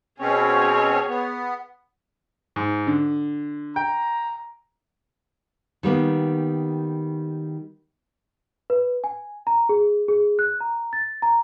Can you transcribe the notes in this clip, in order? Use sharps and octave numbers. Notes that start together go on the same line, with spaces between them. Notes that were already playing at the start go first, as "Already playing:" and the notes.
B2 C4 C#4 G#4 C#5
B3
G#2
D3
G5 A#5
D#3 G3 A#3 B3
B4
G#5
A#5
G#4
G#4
F#6
A#5
A6
A#5